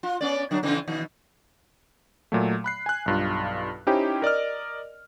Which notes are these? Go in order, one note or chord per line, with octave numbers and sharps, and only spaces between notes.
F4
B3 C#4 D5
D3 F#3 D4
C#3 E3 C4
B2 D#3
A#2 F#3 A3
B5 F#6 C7
G#5 F#6
B1 G2 F4
C#4 D#4 E4 G4 C5 G5
A#4 D5 D#5 F6